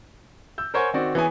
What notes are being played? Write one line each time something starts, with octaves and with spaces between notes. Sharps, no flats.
E6 G6
A#4 C5 C#5 F#5 G#5
D#3 C4 F#4 D5
E3 B3 G#4 C#5 G#5